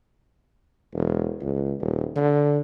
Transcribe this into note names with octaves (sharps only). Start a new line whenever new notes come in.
E1
C#2
D#1
D3